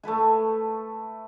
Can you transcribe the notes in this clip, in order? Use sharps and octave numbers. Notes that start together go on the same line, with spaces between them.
A3 A4 B4 G#5